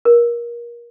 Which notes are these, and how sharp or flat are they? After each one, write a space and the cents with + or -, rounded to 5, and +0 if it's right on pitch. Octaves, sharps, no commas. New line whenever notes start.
A#4 +25